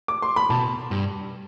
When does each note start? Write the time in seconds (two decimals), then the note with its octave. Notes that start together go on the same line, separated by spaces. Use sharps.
0.08 D6
0.22 C6
0.36 B5
0.50 B2 A5
0.91 G2